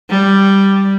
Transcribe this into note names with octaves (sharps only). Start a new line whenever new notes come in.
G3